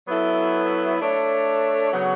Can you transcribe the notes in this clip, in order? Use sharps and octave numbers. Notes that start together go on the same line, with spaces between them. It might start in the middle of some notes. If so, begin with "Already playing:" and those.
F#3 B3 E4 A4
A3 D4 A4 C#5
C#3 F#3 B3 F#4 C#5